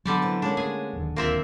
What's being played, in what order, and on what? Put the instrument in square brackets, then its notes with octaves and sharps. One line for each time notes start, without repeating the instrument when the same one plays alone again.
[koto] D3 G3 D5 [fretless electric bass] F#3 A#3 B3
[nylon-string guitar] E3 C4
[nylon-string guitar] G#3 A#3 C#4 [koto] D4
[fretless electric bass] A3 [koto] G#4
[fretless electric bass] D1 D#2 D3
[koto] A#3 C4 E5 [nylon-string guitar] F4 A#4